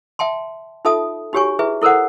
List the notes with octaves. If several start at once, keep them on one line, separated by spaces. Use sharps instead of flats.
E5 G5 A5 C6
D#4 F4 A4 E5 A5 D#6
D#4 F#4 G4 C#5 G#5 C#6
E4 G#4 B4 E5
E4 A4 A#4 C5 F#5